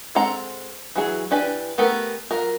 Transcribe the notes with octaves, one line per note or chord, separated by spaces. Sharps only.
G#3 C4 A4 F#5 A#5
E3 F#3 G#4
E3 D4 G4 B4 G#5
A3 B3 G4 A4 A#4
F#3 F4 A#4